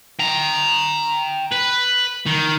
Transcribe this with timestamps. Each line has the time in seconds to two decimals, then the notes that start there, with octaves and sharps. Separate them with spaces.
0.19 G5 A#5
1.52 B4
2.26 D#3